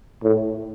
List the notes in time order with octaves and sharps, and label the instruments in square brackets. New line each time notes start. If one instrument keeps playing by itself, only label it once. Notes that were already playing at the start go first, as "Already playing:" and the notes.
[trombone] A2